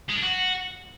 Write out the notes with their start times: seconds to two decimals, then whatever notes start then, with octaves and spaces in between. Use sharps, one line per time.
0.09 G#3
0.16 D4
0.23 F#4